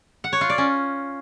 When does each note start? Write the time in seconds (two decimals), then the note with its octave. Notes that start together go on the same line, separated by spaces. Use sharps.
0.24 F#5
0.33 C#5
0.41 F4
0.50 D5
0.58 C#4